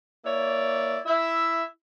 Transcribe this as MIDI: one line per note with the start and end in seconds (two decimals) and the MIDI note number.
0.24 0.98 58
0.24 0.98 64
0.24 0.98 73
0.24 0.98 74
1.04 1.61 64
1.04 1.61 76